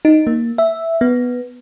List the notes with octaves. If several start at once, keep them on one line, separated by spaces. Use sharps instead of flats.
D#4
A#3
E5
B3